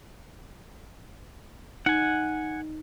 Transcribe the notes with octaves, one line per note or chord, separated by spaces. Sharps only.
D#4 F#5 G#5